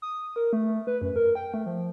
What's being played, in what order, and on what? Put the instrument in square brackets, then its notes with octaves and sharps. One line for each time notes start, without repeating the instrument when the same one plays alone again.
[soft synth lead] D#6
A#4
A3
B4
F#2
A#4
G5
A3
F3